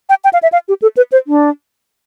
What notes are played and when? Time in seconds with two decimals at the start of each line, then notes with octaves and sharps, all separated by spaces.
0.09 G5
0.24 G5
0.33 F5
0.43 E5
0.52 F5
0.68 G4
0.82 A4
0.97 B4
1.12 C5
1.27 D4